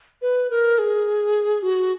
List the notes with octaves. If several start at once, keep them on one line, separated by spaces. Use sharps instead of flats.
B4
A#4
G#4
F#4